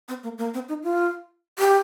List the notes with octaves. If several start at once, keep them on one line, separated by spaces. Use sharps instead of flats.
C4
A#3
A#3
C4
D#4
F4
G4